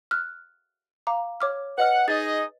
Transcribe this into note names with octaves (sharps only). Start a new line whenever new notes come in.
F6 F#6
F5 A#5 D6
C#5 D6 F6
B4 D#5 F#5 F6
D#4 G#4 D#5 A6